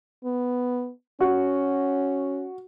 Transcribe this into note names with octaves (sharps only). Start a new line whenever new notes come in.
B3
C#4 F#4